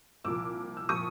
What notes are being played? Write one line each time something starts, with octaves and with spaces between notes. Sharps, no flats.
C2 A#2 F3 D6 E6
E6
A#2 F3 C#6 D#6